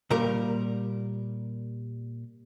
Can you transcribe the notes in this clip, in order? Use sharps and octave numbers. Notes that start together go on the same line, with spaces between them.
A#2 G3 A#4